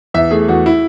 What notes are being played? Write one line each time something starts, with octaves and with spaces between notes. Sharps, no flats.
E2 E5
A3 G#4
E2 F#4
E4